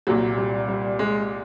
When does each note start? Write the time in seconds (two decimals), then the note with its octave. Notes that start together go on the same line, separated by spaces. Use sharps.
0.07 C2 A#2 F#3
0.37 G3
0.68 G3
0.99 G#3